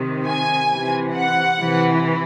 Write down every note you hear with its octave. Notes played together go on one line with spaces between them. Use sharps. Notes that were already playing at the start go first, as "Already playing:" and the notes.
Already playing: C3 D#3
G#5
C3 E3
F#5
C3 E3